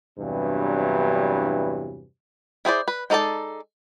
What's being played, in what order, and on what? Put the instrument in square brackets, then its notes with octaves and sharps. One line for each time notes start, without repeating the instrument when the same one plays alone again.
[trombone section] E2 G2 C3 E3 F#3 D4
[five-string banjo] E4 G#4 C5 D5
B4
G#3 D#4 A4 D5 A5